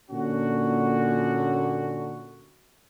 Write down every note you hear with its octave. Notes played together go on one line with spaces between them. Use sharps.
A#2 D3 C#4 F#4